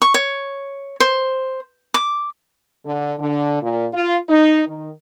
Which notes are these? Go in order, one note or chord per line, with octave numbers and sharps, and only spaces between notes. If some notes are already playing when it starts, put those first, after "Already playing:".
C#6
C#5
C5
D6
D3
D3
A#2
F4
D#4
D#3